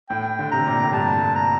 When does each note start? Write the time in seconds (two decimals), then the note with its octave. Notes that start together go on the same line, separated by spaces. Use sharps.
0.10 A2 G5
0.39 D3
0.52 C3 A#5
0.67 A#2
0.80 A2
0.93 G2 A5
1.22 G2
1.36 A#5